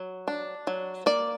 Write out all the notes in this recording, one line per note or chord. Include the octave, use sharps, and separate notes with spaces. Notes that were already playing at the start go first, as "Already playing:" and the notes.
Already playing: F#3
D4
F#3
A#3 D5